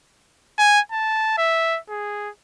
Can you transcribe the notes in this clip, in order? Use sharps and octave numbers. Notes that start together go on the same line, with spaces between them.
G#5
A5
E5
G#4